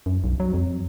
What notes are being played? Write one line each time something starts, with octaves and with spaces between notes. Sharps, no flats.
F#2
B1
F#3
F2